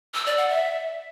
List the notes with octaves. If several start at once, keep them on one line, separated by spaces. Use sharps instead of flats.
E6
D5
F#5
E5